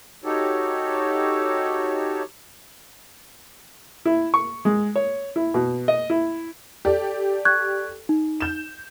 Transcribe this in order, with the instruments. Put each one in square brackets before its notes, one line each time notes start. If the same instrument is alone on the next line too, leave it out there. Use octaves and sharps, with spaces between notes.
[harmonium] D#4 F#4 G4 A4 C#5
[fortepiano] E4
C#6
G#3
C#5
E4
B2
D#5
E4
[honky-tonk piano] G4 A4 D5
[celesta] C#6 F#6 G#6
D#4
[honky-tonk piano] G6 E7